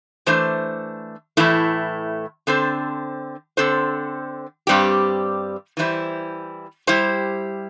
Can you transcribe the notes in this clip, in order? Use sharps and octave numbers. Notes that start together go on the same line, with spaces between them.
E3 A3 D4 C5
A2 E3 A3 E4
D3 C4 A4 C5
D3 C4 A4 C5
G2 G3 C4 G4
E3 G3 E4 C5
G3 E4 G4 C5